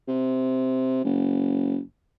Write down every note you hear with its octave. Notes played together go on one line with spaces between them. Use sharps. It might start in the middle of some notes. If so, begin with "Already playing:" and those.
C3
F#1